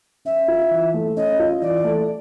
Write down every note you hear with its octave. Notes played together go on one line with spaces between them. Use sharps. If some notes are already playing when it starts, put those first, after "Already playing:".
C#4 E5
F4
E3
A3
C#4 D#5
F4
E3 D5
A3